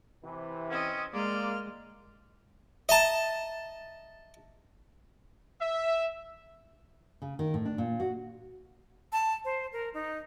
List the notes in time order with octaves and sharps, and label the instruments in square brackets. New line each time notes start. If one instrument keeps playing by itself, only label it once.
[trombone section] C3 E3
[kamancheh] C4 D#5 [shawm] C#4
[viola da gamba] G#3 [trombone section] A#3 [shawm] D5 [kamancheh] C6 F6
[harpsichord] D#5 A5 [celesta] E5 A#5
[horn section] E5
[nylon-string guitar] C#3
D#3
A2
D4
A#2
F#4
[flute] A5
C5
A#4
D#4